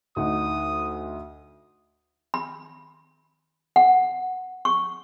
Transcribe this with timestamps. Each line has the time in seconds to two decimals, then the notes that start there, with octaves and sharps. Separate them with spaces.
0.16 D2 D#4 F#5 D#6
2.34 B5
3.76 F#5
4.65 C#6